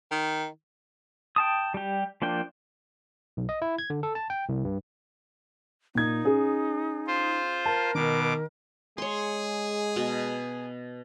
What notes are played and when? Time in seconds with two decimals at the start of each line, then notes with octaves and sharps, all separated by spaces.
0.12 D#3
1.36 G5 A5 D#6
1.74 G3 G4
2.22 F3 A#3 D4 G5
3.37 B1
3.49 D#5
3.62 E4
3.78 G#6
3.90 D3
4.03 A4
4.15 A5
4.30 G5
4.49 C2
4.65 G2
5.95 A#2 D#4 G#6
6.24 C#4 G#4
7.07 F4 C5
7.66 A#4 A5
7.95 B2 D#3 D6
8.98 G#3 G#4 C#5 C6
9.96 B2